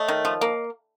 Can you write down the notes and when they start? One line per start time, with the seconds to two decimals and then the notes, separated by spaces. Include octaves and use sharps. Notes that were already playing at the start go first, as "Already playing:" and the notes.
Already playing: A3 C#5 D#5
0.08 D#3
0.25 F3
0.41 A#3